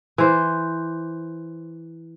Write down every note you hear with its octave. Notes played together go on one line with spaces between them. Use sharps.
E3 C5